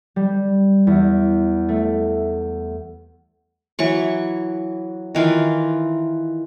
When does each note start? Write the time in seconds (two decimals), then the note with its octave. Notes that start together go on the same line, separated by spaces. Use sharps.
0.16 G3
0.87 E2
1.69 A3
3.79 E3 F#3 C#6
5.15 D#3 E3 F4